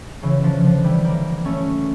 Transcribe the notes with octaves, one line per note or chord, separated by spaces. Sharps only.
C#3 E3
D3 F3
D3 F3
E3 G3
G3 A#3
A3 C#4